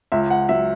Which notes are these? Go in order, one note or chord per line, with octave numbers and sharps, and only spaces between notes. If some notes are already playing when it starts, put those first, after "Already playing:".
C#2 E5
F#5
F#3 E5